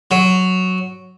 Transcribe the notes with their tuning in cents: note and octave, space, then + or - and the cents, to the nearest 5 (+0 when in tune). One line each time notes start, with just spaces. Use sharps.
F#3 +0